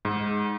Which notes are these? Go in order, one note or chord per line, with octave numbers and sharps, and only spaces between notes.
G#2